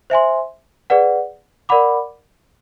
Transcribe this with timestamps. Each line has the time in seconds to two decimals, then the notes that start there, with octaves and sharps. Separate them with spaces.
0.10 C5 E5 G#5 C6
0.90 G#4 B4 D5 F#5
1.69 A#4 D5 F#5 B5 D6